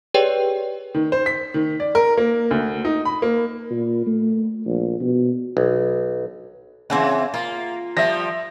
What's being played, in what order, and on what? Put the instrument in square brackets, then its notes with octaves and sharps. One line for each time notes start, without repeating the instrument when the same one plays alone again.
[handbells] G4 G#4 B4 C#5 D5 G5
[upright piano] D#3
C5
B6
D#3
D5
A#4
A#3
D2
D#4
B5
A#3
[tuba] A#2
A3
A#1
B2
[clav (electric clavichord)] B1
[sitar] C#3 E3 [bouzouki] C4 E5 F#5
[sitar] A#3 [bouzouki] F4
[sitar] F3 G3 [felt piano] E5 A#6